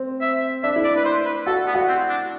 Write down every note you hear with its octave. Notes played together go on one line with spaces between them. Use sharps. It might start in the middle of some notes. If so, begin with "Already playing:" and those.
Already playing: C4
E5
D4 E5
E4
D5
D4
B4
C5
B4
F#4 A4
B3
F#4
C4
D4